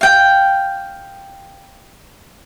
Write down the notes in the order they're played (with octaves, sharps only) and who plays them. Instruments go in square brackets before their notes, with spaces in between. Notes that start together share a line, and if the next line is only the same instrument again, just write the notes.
[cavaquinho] F5 G5